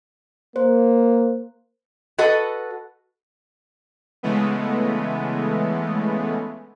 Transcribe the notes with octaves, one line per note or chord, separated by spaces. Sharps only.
A#3 C5
F#4 A4 B4 D#5 F#5
C#3 E3 G#3 A3 B3